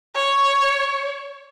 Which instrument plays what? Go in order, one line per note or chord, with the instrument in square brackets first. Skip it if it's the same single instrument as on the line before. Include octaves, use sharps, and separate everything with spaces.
[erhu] C#5